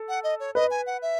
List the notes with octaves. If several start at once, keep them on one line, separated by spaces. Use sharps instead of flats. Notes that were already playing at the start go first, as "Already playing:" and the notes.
Already playing: A4
F#5
D#5
C#5
B4 D#5
G#5
F#5
E5